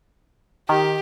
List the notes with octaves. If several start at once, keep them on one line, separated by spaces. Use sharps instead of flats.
D#3 G4